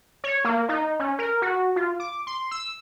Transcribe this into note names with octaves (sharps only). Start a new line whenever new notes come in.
C#5
A#3
D#4
C#4
A#4
F#4
F4
D6
C6
E6